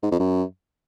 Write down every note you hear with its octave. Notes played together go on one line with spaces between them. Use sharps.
G#2
F2
F#2